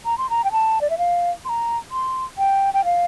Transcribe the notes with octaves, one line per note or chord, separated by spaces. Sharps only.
A#5
C6
A#5
G5
A5
D5
E5
F5
C6
A#5
C6
G5
G5
F5